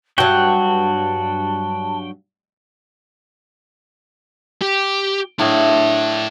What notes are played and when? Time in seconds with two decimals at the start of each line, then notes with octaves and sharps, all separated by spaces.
0.18 G2 F#3 F#4 G5 A5
4.62 G4
5.39 A2 D4 F5